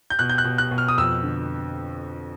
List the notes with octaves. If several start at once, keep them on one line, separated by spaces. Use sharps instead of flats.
G6
B2 F#6
G6
F#6
B2
F#6
B2
F6
D#6
F2 E6
D3